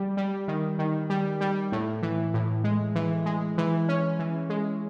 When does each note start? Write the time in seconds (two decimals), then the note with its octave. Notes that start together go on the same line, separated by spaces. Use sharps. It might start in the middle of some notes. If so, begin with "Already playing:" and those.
Already playing: G3
0.17 G3
0.48 D#3
0.79 D#3
1.10 G3
1.41 G3
1.72 A2
2.02 E3
2.34 A2
2.64 G#3
2.95 E3
3.26 G#3
3.58 E3
3.89 C#4
4.19 E3
4.50 G#3